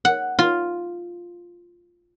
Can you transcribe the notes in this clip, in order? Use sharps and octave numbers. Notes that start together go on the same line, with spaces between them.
F#5
F4